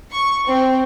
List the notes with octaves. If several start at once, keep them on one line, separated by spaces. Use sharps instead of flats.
C#6
C4